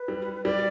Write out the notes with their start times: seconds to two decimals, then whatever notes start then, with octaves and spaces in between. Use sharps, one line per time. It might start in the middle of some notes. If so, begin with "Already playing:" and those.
Already playing: B4
0.08 G3
0.45 G3 D5